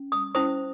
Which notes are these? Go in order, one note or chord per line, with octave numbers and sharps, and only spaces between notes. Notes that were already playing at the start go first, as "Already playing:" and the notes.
Already playing: C#4
D#6
C#4 E4 C5 D#6